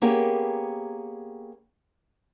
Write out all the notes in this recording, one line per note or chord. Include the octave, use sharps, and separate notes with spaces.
A#3 B3 C#4 G4 G#4 A#4